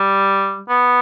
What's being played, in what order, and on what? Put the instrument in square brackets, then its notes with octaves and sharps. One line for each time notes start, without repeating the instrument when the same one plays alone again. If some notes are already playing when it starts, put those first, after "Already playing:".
Already playing: [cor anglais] G3
B3